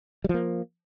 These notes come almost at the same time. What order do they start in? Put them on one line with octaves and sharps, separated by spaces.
G3 F3 A#3